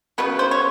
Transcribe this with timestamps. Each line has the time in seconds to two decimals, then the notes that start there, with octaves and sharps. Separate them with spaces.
0.18 C#3 F#3 B3 B4
0.39 C5
0.51 C#5